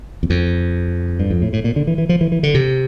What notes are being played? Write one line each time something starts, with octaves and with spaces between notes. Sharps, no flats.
E2
F2
G2
F2
A2
A2
A#2
D3
E3
E3
F3
E3
E3
D3
C3